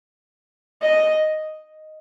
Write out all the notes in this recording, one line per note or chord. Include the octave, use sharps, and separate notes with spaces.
D#5